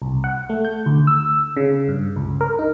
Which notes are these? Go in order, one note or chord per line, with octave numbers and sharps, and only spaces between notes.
C2
F#5
A3
G6
D2
E6
C#3
G2
C#2
A#4
D#4